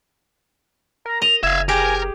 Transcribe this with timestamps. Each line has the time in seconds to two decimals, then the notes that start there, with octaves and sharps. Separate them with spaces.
1.06 A#4 A#5
1.22 D#5 F7
1.43 F#1 E5 F5 G#6
1.68 G4 G#4 A#4 G5 G#5